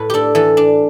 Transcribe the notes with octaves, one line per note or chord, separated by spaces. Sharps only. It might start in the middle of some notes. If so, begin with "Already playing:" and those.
Already playing: A2 B4
D4 G4 A4
E3 A4
D4